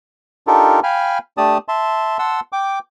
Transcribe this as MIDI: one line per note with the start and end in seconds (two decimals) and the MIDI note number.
0.47 0.80 62
0.47 0.80 63
0.47 0.80 65
0.47 0.80 67
0.47 0.80 69
0.47 0.80 70
0.83 1.18 77
0.83 1.18 79
0.83 1.18 80
0.83 1.18 83
0.83 1.18 89
1.37 1.58 57
1.37 1.58 62
1.37 1.58 67
1.37 1.58 74
1.37 1.58 81
1.37 1.58 87
1.68 2.18 76
1.68 2.18 81
1.68 2.18 84
2.19 2.40 78
2.19 2.40 81
2.19 2.40 84
2.19 2.40 88
2.52 2.79 79
2.52 2.79 86